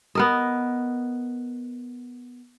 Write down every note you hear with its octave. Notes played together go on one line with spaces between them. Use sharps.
B3 A#4 D#5